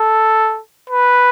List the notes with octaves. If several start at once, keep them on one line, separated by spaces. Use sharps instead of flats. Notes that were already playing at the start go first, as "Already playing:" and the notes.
Already playing: A4
B4